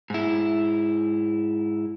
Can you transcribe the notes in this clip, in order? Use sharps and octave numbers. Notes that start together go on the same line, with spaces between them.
G#2 E4